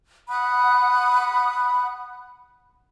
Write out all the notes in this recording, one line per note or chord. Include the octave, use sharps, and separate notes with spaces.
F#5 B5 D#6 F#6